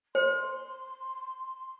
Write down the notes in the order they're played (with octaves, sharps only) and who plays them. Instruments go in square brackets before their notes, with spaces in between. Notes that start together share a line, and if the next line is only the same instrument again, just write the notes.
[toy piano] C5 [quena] C6